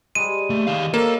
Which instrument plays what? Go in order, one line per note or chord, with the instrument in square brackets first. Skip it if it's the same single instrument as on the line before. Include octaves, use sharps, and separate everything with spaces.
[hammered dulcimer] G3 G#3 [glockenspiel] D#7
[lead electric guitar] A3 A#3
D#3 F5
[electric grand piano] A#3 [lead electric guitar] A4 [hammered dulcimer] C#5 F5